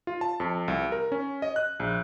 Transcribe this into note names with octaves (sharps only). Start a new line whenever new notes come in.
F4
A5
F2
C2
A#4
C#4
D#5
F#6
A#1